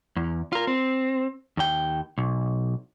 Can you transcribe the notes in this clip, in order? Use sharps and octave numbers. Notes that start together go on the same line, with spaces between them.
E2
F4 A#4
C4
D#2 G5
B1